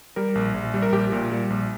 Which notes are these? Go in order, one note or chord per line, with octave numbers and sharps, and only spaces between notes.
G3 A#4
A#1
A#1
G3
A#4
A#1 G4
A#2
G3
A#1